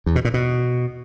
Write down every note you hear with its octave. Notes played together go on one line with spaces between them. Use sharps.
E2
B2
A#2
B2